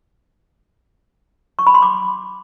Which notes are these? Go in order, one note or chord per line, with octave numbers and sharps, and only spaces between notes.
C#6
B5
C6
D6